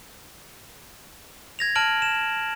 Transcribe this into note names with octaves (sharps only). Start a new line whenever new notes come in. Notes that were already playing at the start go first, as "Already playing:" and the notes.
G#6 A#6 F7
A5 F6 D7 F#7
E7